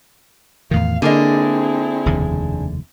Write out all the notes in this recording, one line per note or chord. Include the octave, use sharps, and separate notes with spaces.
E2 A2 D#3 F5
D3 A#3 C4 D4 E4 G#4 A#4 D#5
F1 D#2 C#3